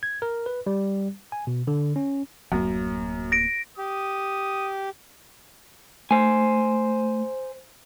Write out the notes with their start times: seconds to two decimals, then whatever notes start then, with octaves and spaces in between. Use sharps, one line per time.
0.03 G#6
0.22 A#4
0.46 B4
0.67 G3
1.32 G#5
1.47 B2
1.67 D3
1.96 C#4
2.52 D1 F#2 A#3
3.32 A#6 D7
3.78 G4 D#6
6.11 A3 C5 G#5